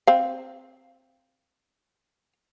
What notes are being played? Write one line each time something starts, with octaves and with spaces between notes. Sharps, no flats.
C4 F5